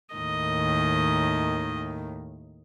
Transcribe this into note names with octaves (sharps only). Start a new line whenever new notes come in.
D#2 A2 D#3 D#5